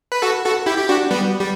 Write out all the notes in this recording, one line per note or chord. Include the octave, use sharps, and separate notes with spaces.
B4
F#4 A4
F#4 A4
E4 G4
G4
D4 F#4
G3 B3
G3